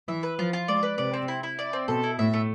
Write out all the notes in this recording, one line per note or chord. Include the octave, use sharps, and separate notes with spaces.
E3 E5
B4
F3 F4
F4
G#3 D5
B4
C3 D5
C4
E4
E4
D5
C4
B2 A4
E4
A2 E5
A3